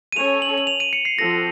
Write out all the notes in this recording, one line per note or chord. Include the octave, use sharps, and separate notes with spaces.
D#7
C#4 A4 C#5 F7
F#7
F#7
F7
D#7
C#7
C7
F3 C4 F#4 A4 A#6